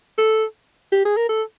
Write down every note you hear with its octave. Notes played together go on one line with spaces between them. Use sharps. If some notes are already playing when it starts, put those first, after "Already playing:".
A4
G4
G#4
A#4
A4